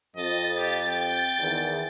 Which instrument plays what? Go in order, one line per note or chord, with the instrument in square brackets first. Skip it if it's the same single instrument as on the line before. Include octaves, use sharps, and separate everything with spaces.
[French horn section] F2 [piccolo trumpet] D#5 [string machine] A6
[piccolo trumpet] G4
G5
[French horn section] E2 D#3